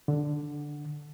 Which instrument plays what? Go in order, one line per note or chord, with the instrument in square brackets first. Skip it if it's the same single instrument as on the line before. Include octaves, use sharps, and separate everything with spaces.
[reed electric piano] D3